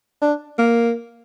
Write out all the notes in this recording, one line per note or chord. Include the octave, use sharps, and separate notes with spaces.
D4
A#3